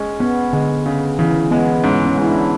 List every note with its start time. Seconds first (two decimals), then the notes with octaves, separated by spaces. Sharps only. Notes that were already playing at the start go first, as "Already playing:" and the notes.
Already playing: G#3 C#4
0.20 B3 C#4
0.53 D3 G#3
0.86 C#3
1.19 C#3 E3
1.51 G#3 B3
1.84 G#2 C#4
2.06 C#4
2.17 G#2 E4
2.28 D4